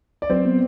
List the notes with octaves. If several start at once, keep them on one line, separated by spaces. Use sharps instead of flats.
D5
F#3 C4 C5
B3